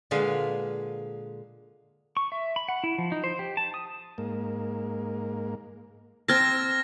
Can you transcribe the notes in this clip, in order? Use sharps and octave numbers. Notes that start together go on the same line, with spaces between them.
A#2 D3 G#3 B4 F5
C#6
E5
B5
F#5
E4
F3
D#4
C5
G4
A5
D#6
G#2 A#3
C4 A5 E6 F6 G#6 A#6